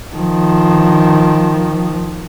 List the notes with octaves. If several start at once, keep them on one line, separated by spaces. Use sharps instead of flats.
D#3 F3